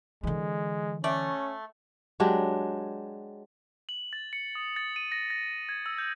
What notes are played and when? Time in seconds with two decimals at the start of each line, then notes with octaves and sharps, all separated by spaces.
0.23 D3 E3 G#3
1.04 A3 C#4 D5
2.20 F#3 G#3 D4 G4
3.89 F#7
4.13 A6
4.33 C#7
4.55 D#6
4.76 A6
4.96 D#7
5.12 A#6
5.30 A#6
5.69 G#6
5.86 E6
5.98 G6